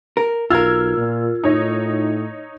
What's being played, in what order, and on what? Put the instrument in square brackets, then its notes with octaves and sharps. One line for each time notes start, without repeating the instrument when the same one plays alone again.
[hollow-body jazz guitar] A#4
[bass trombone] B1 [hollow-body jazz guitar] F4 A#4 [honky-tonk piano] E6 F6 G#6
[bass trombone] A#2
[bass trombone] A2 [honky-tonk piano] D#4 C#5 D#5